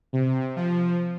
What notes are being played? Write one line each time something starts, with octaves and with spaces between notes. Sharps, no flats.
C3
F3